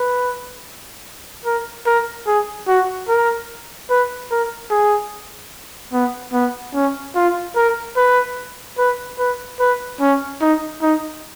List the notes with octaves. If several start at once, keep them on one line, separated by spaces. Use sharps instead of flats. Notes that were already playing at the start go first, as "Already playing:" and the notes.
Already playing: B4
A#4
A#4
G#4
F#4
A#4
B4
A#4
G#4
B3
B3
C#4
F4
A#4
B4
B4
B4
B4
C#4
D#4
D#4